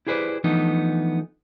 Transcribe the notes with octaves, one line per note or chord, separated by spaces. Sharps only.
E4 G4 G#4 B4 C5 D5
E3 F3 A3 B3 D4 D#4